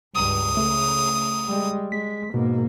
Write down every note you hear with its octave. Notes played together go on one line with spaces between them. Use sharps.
C#2 G2 D#6
C#3 A3
G3 G#3
G#3 B6
G#2 B2 A#3